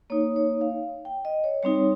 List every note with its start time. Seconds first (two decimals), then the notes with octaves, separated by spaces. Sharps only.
0.10 A#3 D#4 C#5
0.36 C#5
0.61 F5
1.05 G5
1.25 D#5
1.44 C#5
1.63 G3 C4 D#4 C#5